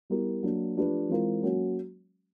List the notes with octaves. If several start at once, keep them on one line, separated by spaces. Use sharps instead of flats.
G3 B3 E4 G4 A#4
F#3 A#3 D4
F3 A3 D4 G4 B4
E3 G#3 C4 F4 A#4
F#3 A#3 C#4 F#4